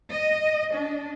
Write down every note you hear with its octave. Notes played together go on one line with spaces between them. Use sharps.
D#5
D4